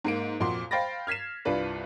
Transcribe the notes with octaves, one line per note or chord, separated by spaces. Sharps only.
G#2 A#3 D7
F2 A#2 F#4 C6
C5 F5 G5 B5 A6 A#6
F6 G#6 B6 C7 E7
C2 G2 F4 B4 D5